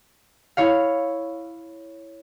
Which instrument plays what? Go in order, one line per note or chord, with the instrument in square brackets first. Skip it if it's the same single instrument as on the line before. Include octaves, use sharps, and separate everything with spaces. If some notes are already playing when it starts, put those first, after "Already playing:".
[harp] E4 C#5 F5